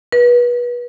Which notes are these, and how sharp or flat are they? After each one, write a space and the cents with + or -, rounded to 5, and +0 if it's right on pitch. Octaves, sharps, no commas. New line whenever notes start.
B4 -30